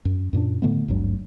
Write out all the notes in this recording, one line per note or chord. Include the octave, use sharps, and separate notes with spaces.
F#2
F#2 A#2 A#3 D4
A2 D3 A3 B3
G#1 D2 G2 F#3